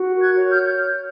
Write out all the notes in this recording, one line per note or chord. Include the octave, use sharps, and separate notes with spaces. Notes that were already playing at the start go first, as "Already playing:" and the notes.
Already playing: F#4
A#4
F#6 G#6
C#5
F6 G6